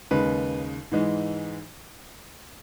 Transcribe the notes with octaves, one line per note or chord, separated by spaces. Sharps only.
D#2 C#3 G#3 B4
G#2 E3 G#3